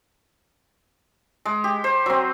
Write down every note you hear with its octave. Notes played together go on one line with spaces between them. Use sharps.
G#3
G4
C5
F#3 C4